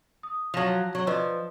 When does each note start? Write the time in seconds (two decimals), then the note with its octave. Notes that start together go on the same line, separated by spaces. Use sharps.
0.23 D#6
0.54 F3 F#3 A5 A#6 F7
0.95 F#3
1.07 F3 B4 D5 D#5